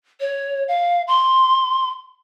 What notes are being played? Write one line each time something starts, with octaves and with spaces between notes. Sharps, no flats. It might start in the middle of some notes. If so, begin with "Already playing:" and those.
C#5
F5
C6